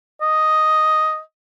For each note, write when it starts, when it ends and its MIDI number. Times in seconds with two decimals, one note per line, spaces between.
0.21 1.20 75